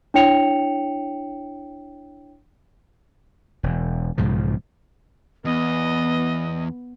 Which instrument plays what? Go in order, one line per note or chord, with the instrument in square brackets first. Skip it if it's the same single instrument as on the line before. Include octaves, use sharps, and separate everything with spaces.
[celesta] D4 E4 C#5 G5 C#7 F7
[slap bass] E1
B1 G#2 C#3 F3
[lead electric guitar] E2 [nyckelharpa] B3 [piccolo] D#5